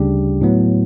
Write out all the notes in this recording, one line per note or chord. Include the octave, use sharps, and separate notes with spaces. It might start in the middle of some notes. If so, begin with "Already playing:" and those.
Already playing: D2 C#3 G3 D4 G4
A2 F#3 B3